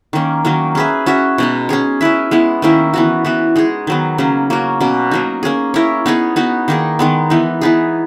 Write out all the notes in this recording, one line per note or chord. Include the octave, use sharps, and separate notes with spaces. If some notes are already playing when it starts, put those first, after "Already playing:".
D#3 A#3 C#4
D#3 F#3 A#3 C#4
C#4 G#4 B4 E5
C#4 F#4 C#5 E5
B2 G#3 D#4
C#4 G#4 C#5
C#4 E4 B4 E5
G#3 B3 E4
D#3 A#3 C#4 E4
E3 B3 F#4
E3 B3 F#4
G#3 D#4 G#4
D#3 F#3 B3
C#3 F#3 A#3 C#4
A#3 C#4 F#4 C#5
B2 A#3 C#4 F#4
F#3 A#3 D#4
A#3 C#4 G#4
C#4 E4 A#4 C#5
B3 D#4 G#4 C#5
B3 D#4 F#4
D#3 A#3 D#4 G#4
D#3 G#3 B3
E3 B3 D#4
E3 B3 D#4 G#4